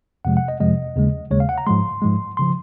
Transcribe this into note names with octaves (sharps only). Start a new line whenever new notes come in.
F2 C3 F3 G#3 F#5
F#5
D#5
F2 C3 F3 G#3 D#5
D#2 C#3 G#3
D#2 C#3 G#3 C#5
F5
F#5
A#5
G#2 F3 G#3 C6
G#2 F3 G#3
C#3 F3 C6